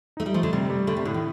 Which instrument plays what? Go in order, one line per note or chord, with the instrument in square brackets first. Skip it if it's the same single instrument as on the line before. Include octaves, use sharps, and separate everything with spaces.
[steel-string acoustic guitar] A3 [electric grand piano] D#4
[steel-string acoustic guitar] G3
[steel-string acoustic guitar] F3 [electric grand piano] A3
[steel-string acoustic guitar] D3
[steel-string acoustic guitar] C3 [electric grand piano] G3
[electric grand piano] G3
[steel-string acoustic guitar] D3 [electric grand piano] A3
[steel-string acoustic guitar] C3
[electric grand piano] A2 [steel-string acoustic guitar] D3
[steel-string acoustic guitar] D#3